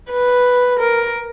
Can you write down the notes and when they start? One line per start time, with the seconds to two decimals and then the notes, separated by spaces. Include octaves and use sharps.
0.10 B4
0.79 A#4